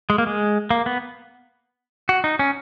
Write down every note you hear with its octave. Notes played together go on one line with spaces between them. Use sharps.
G#3
A#3
G#3
A#3
B3
F#4
D#4
C#4